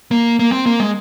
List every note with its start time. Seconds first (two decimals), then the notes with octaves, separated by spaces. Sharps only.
0.11 A#3
0.39 A#3
0.52 C4
0.66 A#3
0.80 G#3